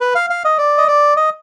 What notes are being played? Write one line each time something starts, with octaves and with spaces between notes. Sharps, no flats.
B4
F5
F5
D#5
D5
D#5
D5
D#5